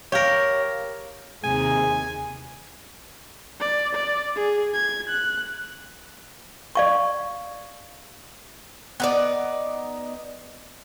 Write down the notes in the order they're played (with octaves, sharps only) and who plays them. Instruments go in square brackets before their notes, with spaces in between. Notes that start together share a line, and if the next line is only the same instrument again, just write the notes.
[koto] G4 A#4 [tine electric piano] C#5 F5
[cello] D#2 C3 [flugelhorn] G#4 [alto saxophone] G#5
[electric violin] D5
D5
G#4
G#6
F#6
[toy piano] D5 F5 C#6
[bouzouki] B3 D#4 D5